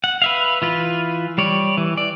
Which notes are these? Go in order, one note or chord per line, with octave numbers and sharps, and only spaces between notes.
F#5
B4 E5 F5
E3 F4 B4
G3 C#5 D5
E3
D5